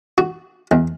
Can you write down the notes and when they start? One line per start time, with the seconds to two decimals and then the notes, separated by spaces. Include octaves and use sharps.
0.18 F#4
0.71 E2